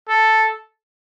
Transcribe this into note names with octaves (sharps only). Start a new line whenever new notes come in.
A4